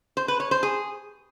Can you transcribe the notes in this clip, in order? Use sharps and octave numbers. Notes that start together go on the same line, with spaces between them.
C5
B4
C#5
C5
G#4